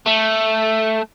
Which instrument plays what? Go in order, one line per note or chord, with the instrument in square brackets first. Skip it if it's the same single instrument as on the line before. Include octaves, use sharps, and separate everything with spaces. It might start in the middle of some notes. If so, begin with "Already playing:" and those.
[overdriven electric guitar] A3